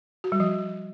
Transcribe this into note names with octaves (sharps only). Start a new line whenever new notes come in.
F#4
G3
F3